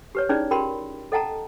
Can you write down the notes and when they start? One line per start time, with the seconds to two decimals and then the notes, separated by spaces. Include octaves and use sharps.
0.15 G4 B4 C#5
0.29 C#4 D#4 E4 G#4 B4 D5
0.51 F4 G4 A#4 G5 B5 C6
1.12 A4 D#5 F#5 G5 A5 A#5